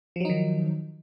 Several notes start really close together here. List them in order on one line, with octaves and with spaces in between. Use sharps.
F3 F#3 D#4 D#3